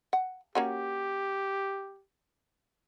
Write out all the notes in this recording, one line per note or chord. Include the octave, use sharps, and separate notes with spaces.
F#5
A#3 C#4 F#4 G4